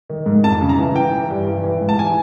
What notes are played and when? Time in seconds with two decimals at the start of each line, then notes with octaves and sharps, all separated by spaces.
0.09 D#3
0.26 G#2
0.44 F2 A5
0.61 C#3
0.69 A#5
0.78 E3
0.95 E3 G5
1.13 E3
1.30 G2
1.47 E3
1.64 E3
1.81 G#2
1.89 A5
1.98 E3 G#5